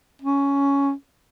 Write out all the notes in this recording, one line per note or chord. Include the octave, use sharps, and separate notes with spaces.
C#4